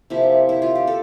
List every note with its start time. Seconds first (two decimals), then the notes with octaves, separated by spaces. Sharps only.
0.10 C3 F3 A#3 E4
0.49 E4
0.62 F4
0.75 G4
0.87 A4